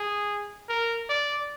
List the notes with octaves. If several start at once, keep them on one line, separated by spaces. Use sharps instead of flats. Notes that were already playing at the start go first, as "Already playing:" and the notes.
Already playing: G#4
A#4
D5